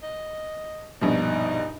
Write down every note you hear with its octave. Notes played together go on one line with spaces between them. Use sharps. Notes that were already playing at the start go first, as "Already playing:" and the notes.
D#5
A#1 G2 B2 D#4